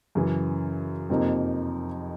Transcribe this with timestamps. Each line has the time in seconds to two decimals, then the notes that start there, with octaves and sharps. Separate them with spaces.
0.15 F#2 C#3 E3
1.10 F2 C3 F3 A#3 D#4